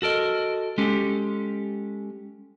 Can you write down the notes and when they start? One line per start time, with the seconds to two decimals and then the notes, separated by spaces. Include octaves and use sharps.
0.02 F#4 A4 A#4 D#5
0.78 G#3 C#4 G4 A4